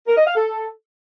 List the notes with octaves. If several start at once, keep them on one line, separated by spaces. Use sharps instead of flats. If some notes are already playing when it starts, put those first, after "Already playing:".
A#4
D#5
F5
A4